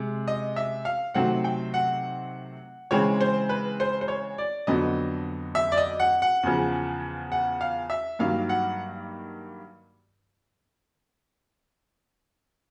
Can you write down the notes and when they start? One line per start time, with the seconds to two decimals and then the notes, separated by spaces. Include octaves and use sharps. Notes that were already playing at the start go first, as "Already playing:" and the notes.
Already playing: C3 G#3
0.28 D#5
0.56 E5
0.85 F5
1.14 C3 D#3 F#3 A3 C4 F#5
1.44 G5
1.74 F#5
2.91 C#3 E3 G#3 C4 C#5
3.20 C5
3.49 B4
3.80 C5
4.01 C5
4.08 C#5
4.38 D5
4.67 F2 D3 F#3 B3 D4 D#5
5.55 E5
5.72 D5
5.77 D#5
6.00 F#5
6.22 F#5
6.43 E2 C#3 F3
7.32 F#5
7.61 F5
7.90 E5
8.19 G2 D#3 F#3 A#3 F5
8.49 F#5